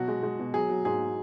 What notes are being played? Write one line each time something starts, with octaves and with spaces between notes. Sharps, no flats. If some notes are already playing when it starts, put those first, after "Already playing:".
Already playing: B2 F#3 F#4
G#3
G#3
B2
F#3 G#4
F#3
G#2 G#4